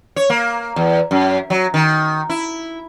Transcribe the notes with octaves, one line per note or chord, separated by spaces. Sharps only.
C#5
A#3
E2
F#2
F#3
D#3
E4